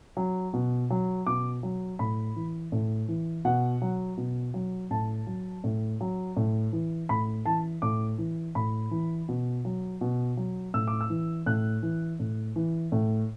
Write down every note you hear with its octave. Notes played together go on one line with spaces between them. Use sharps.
F#3
B2
F#3
B2 D6
F#3
A2 B5
E3
A2
E3
B2 F#5
F#3
B2
F#3
A2 A5
F#3
A2
F#3
A2
E3
A2 B5
E3 A5
A2 D6
E3
A2 B5
E3
B2
F#3
B2
F#3
A2 E6
D6
E6
E3
A2 F#6
E3
A2
E3
A2